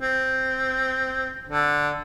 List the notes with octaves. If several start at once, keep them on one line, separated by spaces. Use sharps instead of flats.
C4
D3